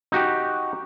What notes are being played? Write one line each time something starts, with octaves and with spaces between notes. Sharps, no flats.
D#4 F#4 G4